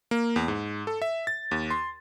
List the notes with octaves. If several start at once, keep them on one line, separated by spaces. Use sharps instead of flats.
A#3
E2
G#2
A4
E5
A6
D#2
C6